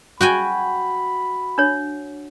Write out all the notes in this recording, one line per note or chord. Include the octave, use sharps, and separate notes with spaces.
F#4 G5 G#5 B5
D4 C#5